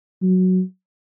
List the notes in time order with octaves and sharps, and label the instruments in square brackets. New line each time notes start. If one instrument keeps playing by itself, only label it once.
[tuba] F#3